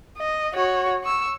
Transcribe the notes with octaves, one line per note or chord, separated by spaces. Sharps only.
D#5
F#4 C#5
C#6 E6